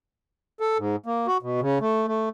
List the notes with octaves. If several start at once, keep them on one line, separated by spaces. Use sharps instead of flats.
A4
G#2
A#3
F#4
B2
C#3
A3
A3